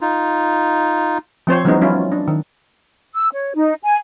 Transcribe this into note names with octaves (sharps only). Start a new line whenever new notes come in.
D#4 F4
F3 C4 C5 C#5
E3 F#3 G#3 B3 C#4 D#4
F#3 C#4 E4 F4
D4
D#3
E6
C#5
D#4
G#5